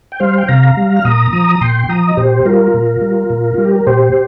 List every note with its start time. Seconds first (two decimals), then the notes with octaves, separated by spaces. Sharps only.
0.12 G5
0.20 G3 C5 F5
0.38 G5
0.48 C3 F5 A#5
0.77 G3
0.96 F6
1.05 A#2 A#5 D#6
1.33 F3 A#5 D#6
1.61 A#2 G5 C6
1.83 C6
1.89 F3 A#5 D#6
2.07 D#5
2.17 A#2 G4 C5
2.45 G3 F4 A#4
2.74 A#2
3.01 G3
3.30 A#2
3.54 G3 F4
3.65 G4
3.76 A#4
3.87 A#2 G4 C5